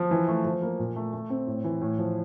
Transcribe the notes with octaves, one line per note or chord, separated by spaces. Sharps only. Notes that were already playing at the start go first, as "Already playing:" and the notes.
Already playing: F3
E3
A3
F3
A#3
A#2
A3
A3
C4
A2
E3
A2
F3